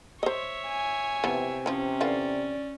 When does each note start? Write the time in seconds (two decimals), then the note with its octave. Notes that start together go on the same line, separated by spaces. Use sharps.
0.23 C5 C#5 D#5 E5
0.66 G#5
1.24 C3 E3 F3 B3
1.66 E3 F3 C#4
2.01 D3 E3 F4 D5